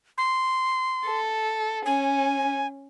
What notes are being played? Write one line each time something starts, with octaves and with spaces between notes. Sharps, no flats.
C6
A4
C#4 G#5